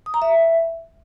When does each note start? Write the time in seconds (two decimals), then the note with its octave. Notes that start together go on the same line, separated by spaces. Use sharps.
0.06 D#6
0.14 A#5
0.22 E5